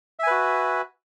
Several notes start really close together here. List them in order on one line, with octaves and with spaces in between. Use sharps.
E5 G#5 B4 F#4